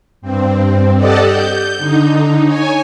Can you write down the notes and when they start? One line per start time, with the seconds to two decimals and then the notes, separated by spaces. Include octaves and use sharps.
0.21 G2 C4
0.95 G4 A4 D5 D#5 F#5 A5
1.25 G6
1.78 D3 D#4
2.44 C#5 G#5